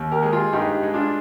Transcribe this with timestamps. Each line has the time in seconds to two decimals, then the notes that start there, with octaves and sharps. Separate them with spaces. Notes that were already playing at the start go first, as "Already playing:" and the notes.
Already playing: D#2
0.12 G4 A#4
0.23 G#3
0.33 F4 G#4
0.53 G2 D#4 G4
0.83 G#3
0.94 D4 F4